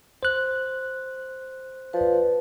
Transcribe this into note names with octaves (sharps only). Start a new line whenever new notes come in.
C5 F#6
F3 B4 D5